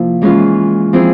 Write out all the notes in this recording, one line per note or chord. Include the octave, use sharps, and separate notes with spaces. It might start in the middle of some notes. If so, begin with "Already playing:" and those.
Already playing: C3 F3 A#3 E4
E3 G#3 C#4 F4
F3 C4 E4 G#4